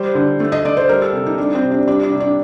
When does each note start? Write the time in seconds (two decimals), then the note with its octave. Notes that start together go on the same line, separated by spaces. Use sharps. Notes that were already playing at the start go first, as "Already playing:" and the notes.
Already playing: G3 C5
0.15 D3
0.40 A3
0.52 D#5
0.64 A3 D5
0.77 C5
0.89 G3 A#4
1.02 A4
1.13 C3
1.26 D#4
1.38 G3 D4
1.55 C4
1.63 C3
1.71 D4
1.87 G3 D4
2.03 D4
2.11 C3
2.20 D4